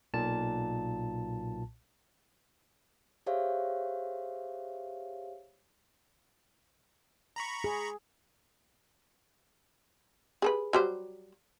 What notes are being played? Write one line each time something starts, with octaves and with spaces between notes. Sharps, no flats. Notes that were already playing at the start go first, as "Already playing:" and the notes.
B1 A#2 A5
G4 G#4 C5 C#5 E5 F5
A#5 B5 C#6
G#4
G#4 A4 B4
F#3 G3 C5